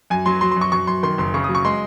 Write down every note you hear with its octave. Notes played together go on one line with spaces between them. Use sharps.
F#2 G#5
F#3 C6
F#3 C6
C6
F#2 C#6
F#2 C#6
F#2 C6
D#3 C6
F#1 C6
C#3 C#6
D#6
F#3
C#6
G#3 C6